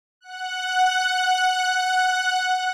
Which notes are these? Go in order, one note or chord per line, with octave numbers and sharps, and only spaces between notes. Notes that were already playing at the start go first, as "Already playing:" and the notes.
F#5 F#6